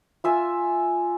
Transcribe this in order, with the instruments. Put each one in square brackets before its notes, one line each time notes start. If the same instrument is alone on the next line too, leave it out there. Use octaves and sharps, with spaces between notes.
[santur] F4 E5 G#5